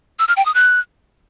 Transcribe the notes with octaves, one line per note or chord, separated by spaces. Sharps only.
E6
F6
G5
D#6
F#6